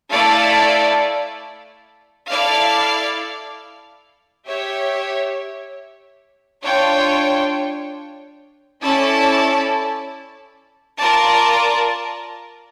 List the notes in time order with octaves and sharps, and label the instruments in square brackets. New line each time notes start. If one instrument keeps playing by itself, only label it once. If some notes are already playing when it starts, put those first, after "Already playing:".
[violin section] A3 E4 A4 D5 F5
E4 A4 D5 F5
G4 C#5 E5
D4 F4 C#5 G5
C#4 E4 A4 D5 A5
F4 A#4 D5 A5